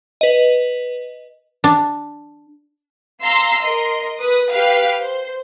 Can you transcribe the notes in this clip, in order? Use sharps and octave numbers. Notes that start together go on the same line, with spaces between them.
B4 D#5
D4
F5 A#5 C6 E6
A#4 D#5 C6
B4 D#6
G4 B4 F5
C5